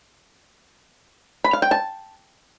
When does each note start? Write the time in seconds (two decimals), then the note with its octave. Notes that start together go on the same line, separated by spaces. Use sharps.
1.44 B5
1.53 F5
1.62 G5
1.71 A5